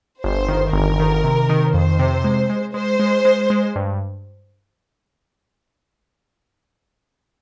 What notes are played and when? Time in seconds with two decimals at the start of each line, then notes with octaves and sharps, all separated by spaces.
0.24 G1 C5
0.48 D#3
0.73 G1 A#4
1.00 D#3
1.24 C3
1.49 D#3
1.74 F2 C5
1.99 C3
2.24 G#3
2.50 G#3
2.74 G#3 C5
2.99 G#3
3.25 G#3
3.50 G#3
3.76 G2